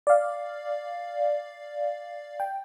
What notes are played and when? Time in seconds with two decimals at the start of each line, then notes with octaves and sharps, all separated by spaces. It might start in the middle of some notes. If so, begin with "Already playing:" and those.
0.07 D5 F5
2.40 G5